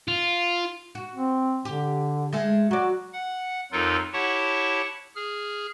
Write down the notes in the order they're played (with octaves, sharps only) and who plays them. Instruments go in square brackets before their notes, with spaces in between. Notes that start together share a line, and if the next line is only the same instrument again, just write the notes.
[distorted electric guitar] F4
[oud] F#4
[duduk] C4
[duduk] D3 [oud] G4
[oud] G#3 A3 G#4
[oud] F#3 D5 [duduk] F#4
[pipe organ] F#5
F2 F#3 D#4 F4 A4 A#4
E4 G4 C#5 F#5 A5 C#6
G#4 F6